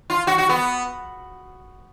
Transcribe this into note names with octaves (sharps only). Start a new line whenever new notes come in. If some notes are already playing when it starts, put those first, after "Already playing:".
F4
F#4
F#4
B3